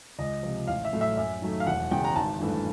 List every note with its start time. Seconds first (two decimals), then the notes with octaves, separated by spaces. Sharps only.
0.19 C#2 D#5
0.43 C3 F3
0.67 A1 F5
0.85 E5
0.93 A2 F#3 A3
1.01 E5
1.17 F#2 E5
1.42 D#3 F#3 A3
1.60 F5
1.67 E1 F#5
1.91 E2 C#3 G5
2.04 A#5
2.16 G#1 A5
2.40 G2 E3 A3